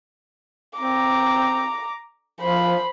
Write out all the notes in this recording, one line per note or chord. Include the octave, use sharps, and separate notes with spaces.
C4 A#5 D6
F3 C5 B5